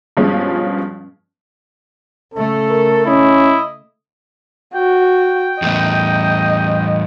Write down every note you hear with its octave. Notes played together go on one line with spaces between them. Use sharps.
G2 B2 F3 G#3 C#4 F4
C#3 A3 A4
A#4
C#4 E4 D#5
F#4 G5
E2 A2 D#5